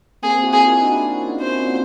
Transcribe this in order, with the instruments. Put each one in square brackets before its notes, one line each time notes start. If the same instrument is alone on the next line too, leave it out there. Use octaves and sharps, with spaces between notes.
[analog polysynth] A#3 C4 [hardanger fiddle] G#4
[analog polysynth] E4 F#4
[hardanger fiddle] G#4
[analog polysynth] D#4 F4
D4 E4
D4 E4
D4
C#4 D#4
[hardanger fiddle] C5